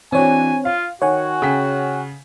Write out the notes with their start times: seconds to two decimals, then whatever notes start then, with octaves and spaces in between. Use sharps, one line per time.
0.12 E3 C4 D4 F#4 C#5 G#5
0.65 F4 F5
1.02 D#3 F#4 C#5 F#5 G#5
1.42 C#3 G5 B6